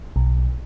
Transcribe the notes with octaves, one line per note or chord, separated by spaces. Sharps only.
B1